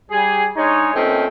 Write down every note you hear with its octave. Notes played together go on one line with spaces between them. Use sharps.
G3 G#4
G#3 D4 D#4 G#4 C#5
A#2 D#3 A3 C4 C#4 D#4